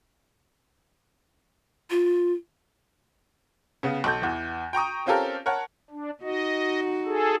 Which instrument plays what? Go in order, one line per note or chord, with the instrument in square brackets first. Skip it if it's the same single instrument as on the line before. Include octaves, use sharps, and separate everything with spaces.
[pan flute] F4
[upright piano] C#3 B3
B1 A4 G6
E2 E3
G5 A#5 C#6 D#6
C4 C#4 F4 G4 A4 A#4
A#4 C#5 F#5 A5
[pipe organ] D4
[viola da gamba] D#4 F#4 [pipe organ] D#5
[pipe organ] G#4 A4